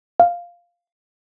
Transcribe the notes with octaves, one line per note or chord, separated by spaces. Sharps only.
F5